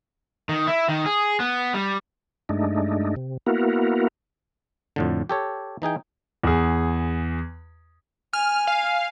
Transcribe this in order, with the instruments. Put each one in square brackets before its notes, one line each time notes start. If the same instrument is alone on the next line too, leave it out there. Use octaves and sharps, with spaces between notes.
[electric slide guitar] D#3
E4
D#3
G#4
B3
G3
[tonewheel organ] G2 G#3 A3 D4 D#4
C3
A#3 B3 E4 F#4 A#4
[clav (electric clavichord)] F2 A2 D3
G4 A4 C#5
E3 D#4 G#4 G5
[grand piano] E2 G#4
[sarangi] G#5 [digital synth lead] F6
[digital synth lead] F5